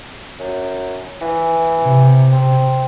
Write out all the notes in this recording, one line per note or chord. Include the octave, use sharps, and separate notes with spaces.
F#2
E3
C3
C4